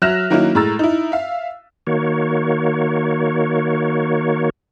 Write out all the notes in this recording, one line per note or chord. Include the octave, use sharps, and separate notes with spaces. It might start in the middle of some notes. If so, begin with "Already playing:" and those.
F#3 E5 F6 F#6 A#6 E7
D#3 F#3 A#3 C#4 D#4 E4
A2 G#3 A#5 E6 A6
D#4 E4
E5 F5
D#3 A#3 F#4 C#5